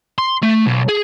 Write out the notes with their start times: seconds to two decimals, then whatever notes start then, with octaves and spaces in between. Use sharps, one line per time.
0.18 C6
0.43 A3
0.66 B1
0.89 G#4